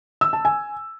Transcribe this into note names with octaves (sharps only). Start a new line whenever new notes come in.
E6
A5
G#5